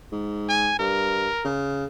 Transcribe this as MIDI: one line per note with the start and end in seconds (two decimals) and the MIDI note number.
0.12 0.74 44
0.49 0.75 80
0.79 1.28 43
0.79 1.50 70
1.44 1.85 49